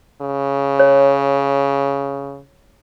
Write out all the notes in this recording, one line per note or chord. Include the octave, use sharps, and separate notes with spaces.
C#3
C#5